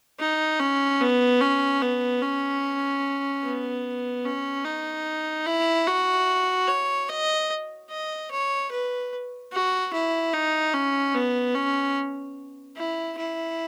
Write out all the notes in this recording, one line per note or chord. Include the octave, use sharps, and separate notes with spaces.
D#4
C#4
B3
C#4
B3
C#4
B3
C#4
D#4
E4
F#4
C#5
D#5
D#5
C#5
B4
F#4
E4
D#4
C#4
B3
C#4
E4
E4